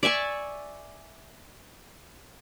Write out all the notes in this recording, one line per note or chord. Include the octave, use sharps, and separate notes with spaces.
D5 E5 G#5 C#6